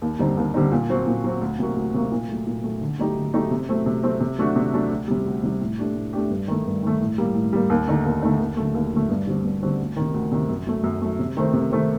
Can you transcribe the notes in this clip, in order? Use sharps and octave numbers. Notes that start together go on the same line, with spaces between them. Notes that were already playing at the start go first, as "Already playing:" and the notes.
D#2
D3 G3 C4 D#4
D#2
D3 G3 C4 D#4
A#2
F#3 C4 F#4
A#2
F#3 C4 F#4
D2
C3 F#3 A#3 F#4
D2
C3 F#3 A#3 F#4
A#2
F#3 A3
A#2
F#3 A3
D3
F#3 A3 D#4 G4
D3
F#3 A3 D#4 G4
C3
F#3 A3 C4
C3
F#3 A3 C4
C3
F#3 A3 D4 F#4
C3
F#3 A3 D4 F#4
D2
C3 G3
D2
C3 G3
A2
A3 D4 G4
A2
A3 D4 G4
G2
D#3 A3
G2
D#3 A3
A2
G3 A#3
A2
G3 A#3
D#2
D3 A3 D#4
D#2
D3 A3 D#4
D#2
D3 F#3 A3
D#2
D3 F#3 A3
G2
D3 G3 C4 F#4
G2
D3 G3 C4 F#4
D2
C3 D#3
D2
C3 D#3
F#2
F#3 A3
F#2
F#3 A3
C3
D#3 A3 C4
C3
D#3 A3 C4